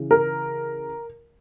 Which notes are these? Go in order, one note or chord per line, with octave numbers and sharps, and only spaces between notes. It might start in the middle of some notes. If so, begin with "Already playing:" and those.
Already playing: C#3 E3
A#4